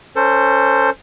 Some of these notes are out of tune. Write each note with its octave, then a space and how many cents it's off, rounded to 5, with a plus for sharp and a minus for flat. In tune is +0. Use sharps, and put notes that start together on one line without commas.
C#4 +0 A4 +30 C5 +0